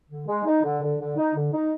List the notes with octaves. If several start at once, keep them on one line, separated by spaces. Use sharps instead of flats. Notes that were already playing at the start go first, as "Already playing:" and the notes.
D3
G#3
D#4
D3
D3
D3
D#4
D3
D#4